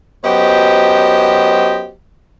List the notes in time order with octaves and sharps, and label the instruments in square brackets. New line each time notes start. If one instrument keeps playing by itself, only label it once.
[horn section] F#2 F#3 B3 G4 C5 D#5